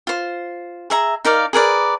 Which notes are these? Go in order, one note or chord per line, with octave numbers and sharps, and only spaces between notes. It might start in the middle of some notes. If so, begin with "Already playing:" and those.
F4 C5
G#4 E5 A#5
D#4 A#4 D5 F5
G#4 A#4 B4 D5